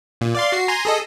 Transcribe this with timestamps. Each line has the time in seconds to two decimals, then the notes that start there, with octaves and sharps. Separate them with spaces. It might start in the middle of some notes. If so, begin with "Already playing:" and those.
0.21 A#2
0.35 D5 F5 C6
0.52 F#4 C7
0.68 G#5 A#5 C6
0.85 G#4 A4 D#5